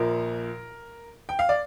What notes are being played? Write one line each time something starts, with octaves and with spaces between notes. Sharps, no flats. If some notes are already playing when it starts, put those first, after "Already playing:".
Already playing: A#1 A#2 F3 A#4
G5
F5
D5